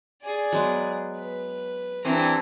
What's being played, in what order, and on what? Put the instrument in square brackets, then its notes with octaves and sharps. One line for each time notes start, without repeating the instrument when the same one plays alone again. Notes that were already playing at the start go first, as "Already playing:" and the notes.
[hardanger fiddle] G#4 D5
[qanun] F#3 G#3 B3
[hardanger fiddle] B4
[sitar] G2 E3 C4 [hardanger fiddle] A#4